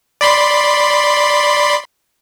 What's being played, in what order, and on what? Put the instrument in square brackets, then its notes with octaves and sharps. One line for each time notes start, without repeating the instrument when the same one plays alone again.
[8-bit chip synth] D5 B5 C6